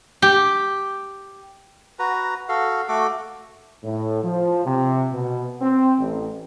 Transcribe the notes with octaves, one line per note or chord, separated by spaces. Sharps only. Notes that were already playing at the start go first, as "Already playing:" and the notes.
G4
F#4 B4 A#5
F#4 A4 F5
A3 F#4 A4 D6
A2
F3
C3
B2
C4
A1